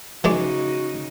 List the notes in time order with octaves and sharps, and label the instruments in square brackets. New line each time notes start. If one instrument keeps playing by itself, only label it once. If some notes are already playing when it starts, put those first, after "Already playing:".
[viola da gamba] C#3 D#4 [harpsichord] E3 G#3 D5 [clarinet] F#4